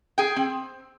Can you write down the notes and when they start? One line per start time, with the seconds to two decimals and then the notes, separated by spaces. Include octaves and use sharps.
0.18 G#4 G5
0.36 C4